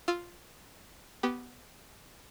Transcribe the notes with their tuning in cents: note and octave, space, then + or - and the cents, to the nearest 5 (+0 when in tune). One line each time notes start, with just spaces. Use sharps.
F4 +0 E6 +0
B3 +0 G4 -20